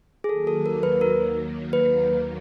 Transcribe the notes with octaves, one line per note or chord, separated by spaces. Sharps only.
G#4
D#2 D#3 F#3 A#3 A4
A4
A#4
B4
A#4
B4